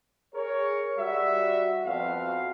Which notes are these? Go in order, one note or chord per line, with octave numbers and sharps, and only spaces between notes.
G#4 A#4 C#5
G3 F#4 E5
F2 B3 F#4 F5